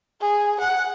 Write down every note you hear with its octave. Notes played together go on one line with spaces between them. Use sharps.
G#4
F#5